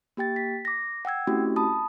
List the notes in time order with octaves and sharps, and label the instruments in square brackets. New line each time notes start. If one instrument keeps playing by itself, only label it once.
[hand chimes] A#3 G4 G5 A6
B6
D6 A#6
F#5 G5 E6 G#6
A3 C4 C#4 E4 F#4 G4
A5 B5 D#6